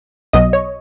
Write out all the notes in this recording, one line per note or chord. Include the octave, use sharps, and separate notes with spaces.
B1 B2 F#3 D#5
C#5